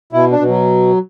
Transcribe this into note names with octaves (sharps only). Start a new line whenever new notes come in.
B2 E4
D4
B2
F#3